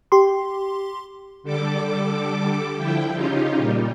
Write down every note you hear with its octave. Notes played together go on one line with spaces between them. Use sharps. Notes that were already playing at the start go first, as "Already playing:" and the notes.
G4 C6
D3 G3 A4 D6
D3 F3 E4 G5
C#3 C#4 D#4 F4 G4
A#2 G3